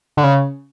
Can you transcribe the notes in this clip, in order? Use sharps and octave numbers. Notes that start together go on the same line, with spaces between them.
D3
C#3